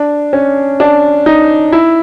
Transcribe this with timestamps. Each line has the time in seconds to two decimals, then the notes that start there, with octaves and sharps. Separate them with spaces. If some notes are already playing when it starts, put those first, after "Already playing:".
Already playing: D4
0.33 C#4
0.80 D4
1.26 D#4
1.72 E4